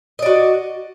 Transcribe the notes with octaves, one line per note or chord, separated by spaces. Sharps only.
F#4 D5 D#5